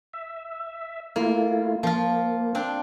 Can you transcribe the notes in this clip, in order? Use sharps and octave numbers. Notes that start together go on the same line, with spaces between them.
E5
A3 A#3 E4 F4
F3 A#3 F4
C4 D4 F4